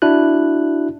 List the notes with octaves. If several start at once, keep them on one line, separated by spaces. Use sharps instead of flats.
D4 E4 F#4 F#6